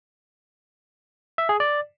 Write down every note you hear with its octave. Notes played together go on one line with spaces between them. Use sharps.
E5
G#4
D5